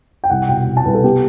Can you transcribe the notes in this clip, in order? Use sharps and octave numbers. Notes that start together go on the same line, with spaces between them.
G5
C2 F#5
B2 G5
C2
A5
C2 B4
A4
B3 G4